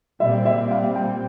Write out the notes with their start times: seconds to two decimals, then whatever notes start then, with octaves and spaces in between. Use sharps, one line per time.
0.20 A#2 G3 C4 E5
0.45 E5
0.71 F5
0.95 G5